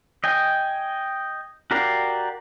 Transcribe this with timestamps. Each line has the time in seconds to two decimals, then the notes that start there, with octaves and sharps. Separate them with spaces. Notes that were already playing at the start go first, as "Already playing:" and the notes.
0.24 D#5 G5 G#5
1.71 F#4 G4 A#4 D5 F5